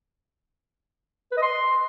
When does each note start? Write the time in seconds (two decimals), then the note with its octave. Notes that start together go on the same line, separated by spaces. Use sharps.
1.32 B4
1.37 D#5
1.42 C6